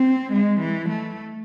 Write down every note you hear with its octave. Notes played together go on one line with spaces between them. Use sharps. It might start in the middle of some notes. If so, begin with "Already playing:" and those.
Already playing: C4
G#3
E3
A3